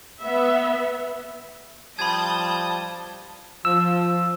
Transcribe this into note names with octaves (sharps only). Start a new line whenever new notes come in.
B3 E5
F3 G3 A5 B5 D#6 G6 G#6
F3 E6